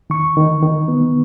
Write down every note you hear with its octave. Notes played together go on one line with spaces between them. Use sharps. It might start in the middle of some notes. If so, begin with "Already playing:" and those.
D#3 C#6
D#3
D#3
B3